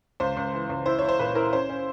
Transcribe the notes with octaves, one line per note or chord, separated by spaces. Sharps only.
C#2 C5
C#2
E3
C#2
E4 C5
E4 C#5
C5
A#2 B4
E4 A#4
C#4 C5
C#4